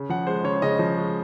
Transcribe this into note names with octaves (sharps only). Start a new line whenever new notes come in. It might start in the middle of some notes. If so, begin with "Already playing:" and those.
Already playing: C#3
F3 F#5
G#3 C5
C#3 C#5
C#3 D#5
F3
G#3